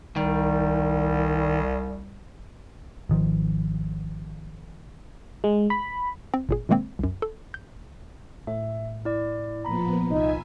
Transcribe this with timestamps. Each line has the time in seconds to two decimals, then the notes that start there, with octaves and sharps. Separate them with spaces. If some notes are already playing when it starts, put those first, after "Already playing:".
0.16 C2 D#3 G3
3.09 G#1 D#3 F3
5.44 G#3
5.70 B5
6.34 C4
6.49 G1 A#2 G#4
6.69 B2 D#3 G#3 A#3 C4
6.99 C2 F#2
7.22 A4
7.54 G6
8.47 A2 E5
9.05 E4 D5
9.65 A#2 F3 B3 A#5 B5
10.11 C2 D#4 F4 E5 G#5